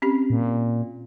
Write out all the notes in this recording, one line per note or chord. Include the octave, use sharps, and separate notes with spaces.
C4 C#4 G4
A#2